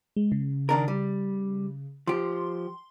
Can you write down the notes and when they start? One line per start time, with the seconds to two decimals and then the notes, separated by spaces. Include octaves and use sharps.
0.16 G#3
0.32 C#3
0.69 D#3 D4 A#4
0.88 G3
2.07 F3 G4 C6